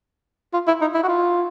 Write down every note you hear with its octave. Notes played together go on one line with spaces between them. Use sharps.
F4
E4
D#4
E4
F#4
F4